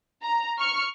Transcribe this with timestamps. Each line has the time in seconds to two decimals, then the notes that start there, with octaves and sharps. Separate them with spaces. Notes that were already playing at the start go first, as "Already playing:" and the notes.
0.23 A#5
0.59 C#6 F6 C#7